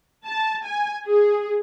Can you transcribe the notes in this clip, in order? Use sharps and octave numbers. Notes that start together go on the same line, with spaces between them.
A5
G#5
G#4